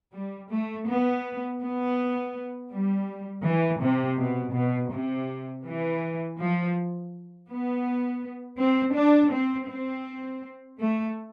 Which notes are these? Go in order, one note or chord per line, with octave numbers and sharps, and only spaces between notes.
G3
A3
B3
B3
G3
E3
C3
B2
B2
C3
E3
F3
B3
C4
D4
C4
C4
A3